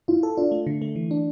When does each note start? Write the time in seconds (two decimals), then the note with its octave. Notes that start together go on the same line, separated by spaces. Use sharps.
0.08 E4 F4
0.23 A4
0.37 D4 F4
0.52 A3
0.67 D3
0.82 A3
0.96 E3
1.11 D4